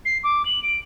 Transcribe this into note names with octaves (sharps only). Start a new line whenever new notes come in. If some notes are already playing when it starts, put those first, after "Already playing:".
C7
D6
F#7
D7